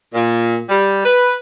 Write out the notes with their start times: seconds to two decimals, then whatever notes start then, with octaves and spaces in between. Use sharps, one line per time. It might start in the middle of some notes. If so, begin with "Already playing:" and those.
0.13 A#2
0.67 G3
1.04 B4